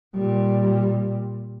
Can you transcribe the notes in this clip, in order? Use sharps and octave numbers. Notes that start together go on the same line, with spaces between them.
A#2 G3